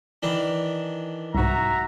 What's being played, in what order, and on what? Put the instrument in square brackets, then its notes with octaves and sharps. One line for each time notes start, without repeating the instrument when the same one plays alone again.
[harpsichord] D#3 E3 D4
[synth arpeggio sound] C2 G#2 [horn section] F#4 E5 A#5